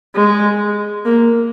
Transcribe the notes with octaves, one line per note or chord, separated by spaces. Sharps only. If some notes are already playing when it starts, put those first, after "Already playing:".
G#3
A#3